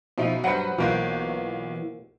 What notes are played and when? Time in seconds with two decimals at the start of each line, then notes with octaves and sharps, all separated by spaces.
0.18 B2 F3 D#4 E5
0.44 G2 F#3 B4 C5 F#5
0.78 B1 E3 A#3 F4 F#4 C5